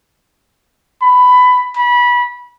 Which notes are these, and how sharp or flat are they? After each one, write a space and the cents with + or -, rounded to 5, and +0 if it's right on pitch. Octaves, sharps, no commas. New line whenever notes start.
B5 +15
B5 -25